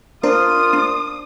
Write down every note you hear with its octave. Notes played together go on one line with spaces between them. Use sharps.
D4 F4 A#4 C5 D5 D#6
D4